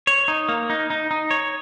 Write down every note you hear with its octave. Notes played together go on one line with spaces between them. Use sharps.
C#5
D#4
A#3
D#4
D#4
D#4
C#5